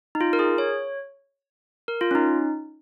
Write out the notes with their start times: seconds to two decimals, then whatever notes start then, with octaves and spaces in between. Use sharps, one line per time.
0.15 D#4
0.21 F4
0.33 A#4
0.39 G#4
0.58 C#5
1.88 A#4
2.01 F4
2.11 C#4
2.15 D#4